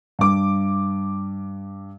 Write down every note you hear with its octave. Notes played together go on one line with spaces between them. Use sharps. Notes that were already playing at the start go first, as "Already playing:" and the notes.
G2 D6